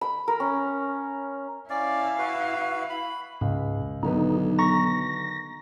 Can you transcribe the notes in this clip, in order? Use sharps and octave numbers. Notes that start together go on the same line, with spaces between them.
B5
A#4
C#4
C#4 E4 D5 F5
F#4 B4
B5
C#2 G#2
B1 D3 D#3 D#4 B4
A#5 C#6 A#6